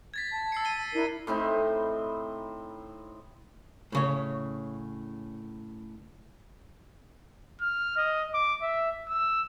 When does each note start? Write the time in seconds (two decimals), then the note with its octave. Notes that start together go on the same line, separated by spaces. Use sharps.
0.14 G#6 A6 B6
0.32 A5
0.52 E6 C7 C#7
0.65 D#7 G7
0.93 D4 E4 A#4
1.27 A2 C4 D#4 B5
3.92 A2 C#3 C#5
7.61 F6
7.97 D#5
8.34 D6
8.62 E5
9.09 E6